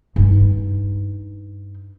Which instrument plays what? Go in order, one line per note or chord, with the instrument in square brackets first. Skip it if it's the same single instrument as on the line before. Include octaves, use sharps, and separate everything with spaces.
[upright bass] G2 D#4